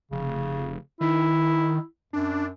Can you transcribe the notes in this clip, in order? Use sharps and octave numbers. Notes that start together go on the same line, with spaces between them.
F1 C#3
D#3 E4
F#2 D4